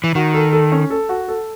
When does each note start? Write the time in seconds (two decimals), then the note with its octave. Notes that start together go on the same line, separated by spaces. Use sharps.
0.04 E3
0.15 D#3 F#4
0.34 A4
0.53 A4
0.72 C#4
0.90 A4
1.09 F#4
1.28 A4